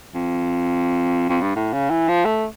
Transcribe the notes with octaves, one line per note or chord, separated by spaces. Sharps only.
F2
F2
G2
A2
C#3
E3
F3
A3